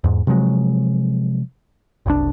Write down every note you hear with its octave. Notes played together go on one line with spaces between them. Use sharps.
E2 G#2
C3 F3 F#3 G#3
F#1 C2 D4